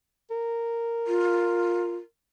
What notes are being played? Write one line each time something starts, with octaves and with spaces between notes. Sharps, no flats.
A#4
F4